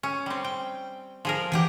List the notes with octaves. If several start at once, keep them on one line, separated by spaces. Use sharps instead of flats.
C#4
G3 C4
G5
F3 G#4 A#4
E3 G4 F#5 G#5